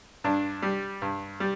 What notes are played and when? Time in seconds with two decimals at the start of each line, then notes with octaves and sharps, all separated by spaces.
0.24 G2 D4
0.62 G3
1.02 G2
1.40 G3